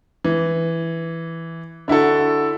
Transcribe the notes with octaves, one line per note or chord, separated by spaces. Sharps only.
E3
D3 E4 F#4 A4